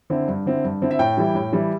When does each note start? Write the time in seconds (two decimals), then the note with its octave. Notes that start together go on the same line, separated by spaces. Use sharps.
0.10 D3 C4 E4
0.28 G2
0.46 D3 C4 E4
0.64 G2
0.82 D3 C4 E4
0.91 E5
0.99 A2 G5
1.17 E3 G3 E4
1.35 A2
1.53 E3 G3 E4